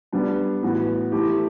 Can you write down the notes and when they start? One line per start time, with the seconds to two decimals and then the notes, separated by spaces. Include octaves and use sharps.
0.12 G3 B3 D4
0.63 A2 E3 B3 F#4
1.12 E3 A3 E4 G4